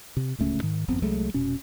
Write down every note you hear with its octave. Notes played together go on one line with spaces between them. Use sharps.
C3
D1 C#2 A3 C#4
G#2 D#3
G1 F2 B3 C4
C2 F#3 G#3 A3
F1 B2 C#4